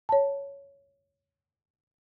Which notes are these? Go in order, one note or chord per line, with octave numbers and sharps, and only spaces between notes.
C#5 A5